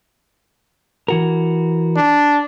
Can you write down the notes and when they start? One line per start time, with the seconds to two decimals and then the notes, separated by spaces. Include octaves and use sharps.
1.08 E3 F#4 A#4
1.96 D4